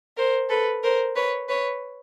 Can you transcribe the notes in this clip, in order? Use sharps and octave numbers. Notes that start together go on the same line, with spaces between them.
A#4 C5
A4 B4
A#4 C5
B4 C#5
B4 C#5